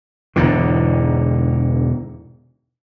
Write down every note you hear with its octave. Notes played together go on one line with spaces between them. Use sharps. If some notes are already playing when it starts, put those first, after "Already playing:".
E1 E2 G#2 D3